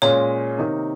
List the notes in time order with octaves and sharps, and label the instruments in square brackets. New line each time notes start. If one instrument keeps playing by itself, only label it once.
[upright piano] A#2 G#3 C#4 F4 [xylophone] C#5
[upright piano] C3 D#3 A#3 D#4